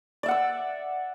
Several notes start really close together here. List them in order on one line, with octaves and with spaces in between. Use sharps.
D5 E5 F#5 E6